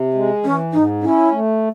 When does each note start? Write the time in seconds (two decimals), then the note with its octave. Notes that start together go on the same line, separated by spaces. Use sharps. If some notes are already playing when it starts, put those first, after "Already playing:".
Already playing: C3
0.14 G#3
0.44 E3 C#4
0.73 G#2 D#4
1.02 C#4 E4
1.31 A3